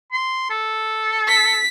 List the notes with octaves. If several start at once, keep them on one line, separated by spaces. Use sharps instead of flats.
C6
A4
B6